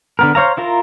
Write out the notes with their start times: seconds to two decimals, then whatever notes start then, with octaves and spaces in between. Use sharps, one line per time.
0.19 D3 B3 A#4
0.35 C5 C#5 F5 A#5
0.57 E4 F4 A#4 A#5